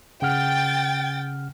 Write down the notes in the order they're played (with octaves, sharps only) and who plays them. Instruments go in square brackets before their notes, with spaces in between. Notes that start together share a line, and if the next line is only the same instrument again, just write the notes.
[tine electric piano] C#3 F#5 F6 [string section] G5 A6